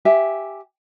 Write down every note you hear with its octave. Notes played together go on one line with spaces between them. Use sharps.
G4 E5 G#5